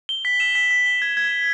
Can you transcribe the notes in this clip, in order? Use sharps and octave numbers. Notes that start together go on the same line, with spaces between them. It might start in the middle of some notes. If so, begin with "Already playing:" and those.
G7
B6
E7
B6
B6
G7
G#6
G#6
E7